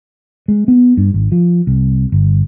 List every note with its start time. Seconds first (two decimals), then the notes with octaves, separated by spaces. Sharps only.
0.48 G#3
0.68 B3
0.97 G2
1.14 G#1
1.32 F3
1.67 C2
2.12 G1